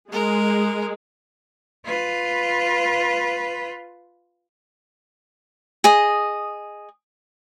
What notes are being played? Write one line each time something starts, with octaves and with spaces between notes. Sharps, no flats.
G#3 A#4
F4 B4
G#4 D#5